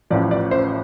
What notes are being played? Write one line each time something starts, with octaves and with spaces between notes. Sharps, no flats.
A1 A2 F3 D5
D5
C5